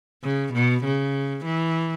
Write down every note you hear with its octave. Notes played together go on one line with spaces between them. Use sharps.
C#3
B2
C#3
E3